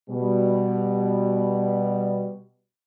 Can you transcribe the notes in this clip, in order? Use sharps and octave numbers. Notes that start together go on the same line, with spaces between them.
B2 G3